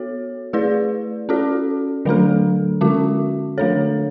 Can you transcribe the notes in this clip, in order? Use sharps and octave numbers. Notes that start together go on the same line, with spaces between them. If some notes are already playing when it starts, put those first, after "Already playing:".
Already playing: B3 F#4 A4 C#5
A3 E4 G#4 B4 D5
C#4 F#4 A4 D5
D3 F#3 A3 D4 A4
D3 G#3 C#4 F#4
D3 A3 D4 A4 C#5